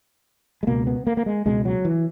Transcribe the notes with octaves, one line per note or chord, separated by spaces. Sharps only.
G#3
C#2 B2 A#3
B3
A#3
A#3
G#3
C#2 B2 G#3
F#3
E3